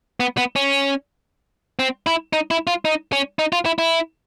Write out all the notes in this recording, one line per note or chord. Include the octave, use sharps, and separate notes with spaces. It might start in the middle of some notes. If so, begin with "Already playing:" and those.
B3
B3
C#4
C4
E4
D#4
E4
F4
D#4
C#4
D#4
F4
E4
E4